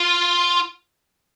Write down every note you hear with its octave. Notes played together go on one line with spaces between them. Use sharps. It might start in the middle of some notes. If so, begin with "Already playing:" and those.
Already playing: F4